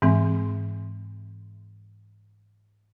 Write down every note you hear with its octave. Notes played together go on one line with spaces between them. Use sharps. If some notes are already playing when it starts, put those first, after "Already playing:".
G#2 E3 G#3 C4